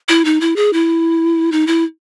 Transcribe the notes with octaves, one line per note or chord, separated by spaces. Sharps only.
E4
D#4
E4
G#4
E4
D#4
E4